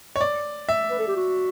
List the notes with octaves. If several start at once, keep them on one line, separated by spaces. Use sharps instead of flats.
C#5
D5
E5
B4
A4
G4
F#4